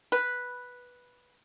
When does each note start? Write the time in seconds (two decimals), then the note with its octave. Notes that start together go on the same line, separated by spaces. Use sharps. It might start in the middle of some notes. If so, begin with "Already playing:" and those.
0.12 B4